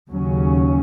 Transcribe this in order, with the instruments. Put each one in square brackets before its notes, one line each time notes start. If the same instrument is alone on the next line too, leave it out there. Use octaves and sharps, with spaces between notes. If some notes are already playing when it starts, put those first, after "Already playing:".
[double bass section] D#2 C#3 F#3 C#4